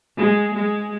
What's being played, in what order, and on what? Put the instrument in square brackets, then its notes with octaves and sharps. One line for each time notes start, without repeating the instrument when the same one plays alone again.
[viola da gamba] G#3
G#3